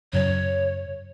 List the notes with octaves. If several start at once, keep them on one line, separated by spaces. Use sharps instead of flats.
F#2 C#3 F#3 C#5